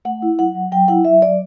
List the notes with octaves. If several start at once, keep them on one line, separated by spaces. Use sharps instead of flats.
A3 F#5
E4
F#3 F#5
F#3
F#3 G5
E4 F#5
F#3 E5
F#3 D5